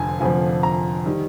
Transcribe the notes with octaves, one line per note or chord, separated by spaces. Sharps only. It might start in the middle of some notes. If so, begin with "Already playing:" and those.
Already playing: F1 F2 D3 F3 G#5
F1 F2 D3 F3 G#5
A#5
D#3 G3